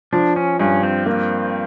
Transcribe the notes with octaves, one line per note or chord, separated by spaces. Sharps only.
F3 D4
C#4
G2 C#4
C4
A#3 C4